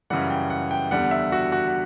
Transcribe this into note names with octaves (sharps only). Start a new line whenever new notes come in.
F#2 C#3 E3 G3 F#5
G5
F#5
G5
E2 D3 G3 F#5
E5
F#4
F#4